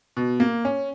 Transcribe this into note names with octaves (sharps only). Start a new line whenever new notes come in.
B2
A#3
C#4